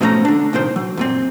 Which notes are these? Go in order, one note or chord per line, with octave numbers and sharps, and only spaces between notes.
G#2 B2 F3 A3 C#4 A#5
D3 D4
C2 A#2 D#3 C5
F#3
F#2 A#2 C4